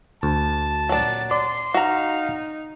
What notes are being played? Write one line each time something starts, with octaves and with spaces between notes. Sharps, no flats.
D2 A5
A#2 F#3 D4 A6
D5 C6
D#4 F#4 F5 A#5